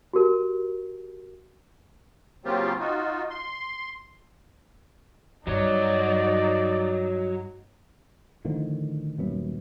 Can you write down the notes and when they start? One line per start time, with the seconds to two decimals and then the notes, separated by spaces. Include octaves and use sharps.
0.13 F#4 G4 A#4
2.45 C#3 F#3 A#3 C4 F4 G4
2.80 D#4 F4 F#4
3.30 C6
5.47 G2 F#3 D#4 C#5 D5
8.45 A2 D3 D#3 F3
9.18 D#1 F#2 B3